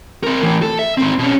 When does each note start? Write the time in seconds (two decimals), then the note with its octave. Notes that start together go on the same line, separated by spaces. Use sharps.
0.24 C4 A#4
0.42 A2 E3
0.62 A4
0.79 E5
0.98 G#2 C4
1.19 B2 C#4